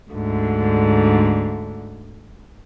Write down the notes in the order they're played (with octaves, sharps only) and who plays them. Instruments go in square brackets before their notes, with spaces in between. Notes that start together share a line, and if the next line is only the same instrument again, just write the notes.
[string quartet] D2 G#2 D3